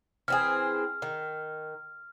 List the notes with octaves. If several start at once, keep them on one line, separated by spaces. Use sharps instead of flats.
E3 C4 G#4 F6
D#3